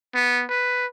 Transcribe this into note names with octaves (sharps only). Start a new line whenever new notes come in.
B3
B4